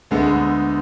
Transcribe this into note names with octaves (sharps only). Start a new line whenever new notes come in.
D2 D3 G#3 B3